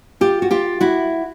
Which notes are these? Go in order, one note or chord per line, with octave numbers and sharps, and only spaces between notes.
F4 G4
F#4
F4 G4
E4 F#4